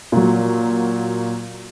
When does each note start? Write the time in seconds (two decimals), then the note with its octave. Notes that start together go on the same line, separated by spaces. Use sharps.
0.12 A#2 F#3